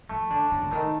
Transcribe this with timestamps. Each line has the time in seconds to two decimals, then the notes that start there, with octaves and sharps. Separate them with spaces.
0.09 F3 A3
0.30 D3 D4
0.51 A2 D3
0.62 D3
0.71 D#3 A3